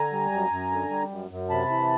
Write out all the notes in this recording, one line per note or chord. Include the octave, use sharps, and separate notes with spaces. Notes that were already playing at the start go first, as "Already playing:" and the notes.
Already playing: D3 G#5 A#5
G3
F#2
F#2
D3
G3
F#2
F#2
C3 A5 B5
E3